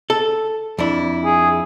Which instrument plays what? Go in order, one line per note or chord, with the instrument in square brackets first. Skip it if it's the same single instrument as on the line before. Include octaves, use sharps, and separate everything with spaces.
[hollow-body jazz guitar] A4
F2 D4 E4
[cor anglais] G#4